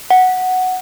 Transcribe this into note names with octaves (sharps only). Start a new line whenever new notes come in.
F#5